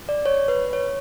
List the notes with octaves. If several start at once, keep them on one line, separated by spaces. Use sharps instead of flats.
D5
C#5
B4
C#5